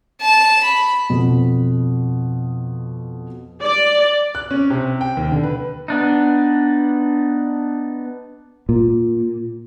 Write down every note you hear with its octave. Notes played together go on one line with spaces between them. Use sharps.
A5
B5
F2 B2
D5
F#6
C#4
C3
G5
D#2
D3
B4
B3 D4 D#4
A#2